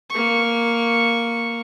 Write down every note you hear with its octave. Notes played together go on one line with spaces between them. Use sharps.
A#3 C#6